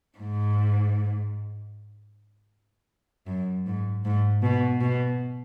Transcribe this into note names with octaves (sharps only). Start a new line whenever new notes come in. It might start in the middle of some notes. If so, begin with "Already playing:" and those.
G#2
F#2
G#2
G#2
B2
B2